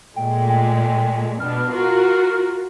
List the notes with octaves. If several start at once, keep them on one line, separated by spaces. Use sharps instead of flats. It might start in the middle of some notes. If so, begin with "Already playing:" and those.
A#2 G#3 A3 G5
G5
B2 B3 D4 F6
F4 F#4 A#4